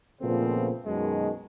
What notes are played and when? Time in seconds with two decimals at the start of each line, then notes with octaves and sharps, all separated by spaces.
0.21 A#2 C#3 F3 A3 B3 C4
0.85 F#2 B2 D#3 G#3